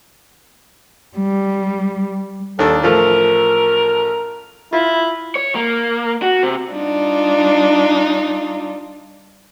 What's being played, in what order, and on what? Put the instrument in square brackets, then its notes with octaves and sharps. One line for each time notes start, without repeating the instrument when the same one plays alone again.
[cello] G3
[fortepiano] D#2 D4 [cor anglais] A4
[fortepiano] A1 F3 A3 [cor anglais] A#4
[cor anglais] E4 [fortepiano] F4
[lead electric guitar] C#5
A#3
F#4
C3
[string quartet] G3 D4 D#4 F4